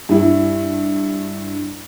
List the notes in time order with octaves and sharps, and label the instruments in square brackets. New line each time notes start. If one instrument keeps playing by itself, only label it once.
[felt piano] G2 E4